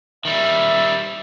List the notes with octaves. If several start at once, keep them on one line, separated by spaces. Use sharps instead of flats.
D#3 G3 E5